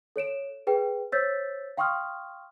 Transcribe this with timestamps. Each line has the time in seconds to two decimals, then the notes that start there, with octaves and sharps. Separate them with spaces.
0.16 A4 C#5 D7 E7
0.67 G#4 B4 G5
1.12 C5 C#5 E6 G6 A6 B6
1.77 F5 G5 C6 C#6 D#6 F6